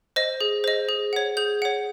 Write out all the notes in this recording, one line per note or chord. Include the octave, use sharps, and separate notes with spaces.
C5 D#5
G#4
C5 D#5
G#4
C#5 F#5
G#4 G6
C#5 F#5